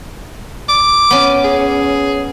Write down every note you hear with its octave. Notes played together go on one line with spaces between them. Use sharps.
D6
B3 C#4
G#4